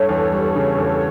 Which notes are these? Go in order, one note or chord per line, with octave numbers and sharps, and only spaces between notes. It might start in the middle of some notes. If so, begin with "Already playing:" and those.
Already playing: G2 A4 C#5
E2
G3
C#3
E2